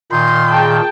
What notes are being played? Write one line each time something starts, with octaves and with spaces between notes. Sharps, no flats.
A#2 D#3 C6 G6
G#4 G5 A5